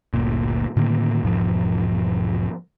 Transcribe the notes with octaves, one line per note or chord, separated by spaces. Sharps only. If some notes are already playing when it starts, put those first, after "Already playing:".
G1 D2 A#2
A2 D3 D#3 A#3
E1 G#2 F3